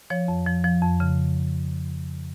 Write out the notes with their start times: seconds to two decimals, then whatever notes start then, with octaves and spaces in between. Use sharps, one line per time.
0.10 F3 C#5
0.28 F2
0.46 F3
0.64 F3
0.82 F2
1.00 C#3